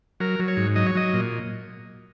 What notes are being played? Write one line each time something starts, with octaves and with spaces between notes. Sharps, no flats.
F#3 A#4
F#3
C#5
G#2
F#3 D#5
C#5
F#3 D#5
A#2